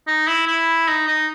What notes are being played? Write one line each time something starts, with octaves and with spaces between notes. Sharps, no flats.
D#4
E4
E4
D#4
D#4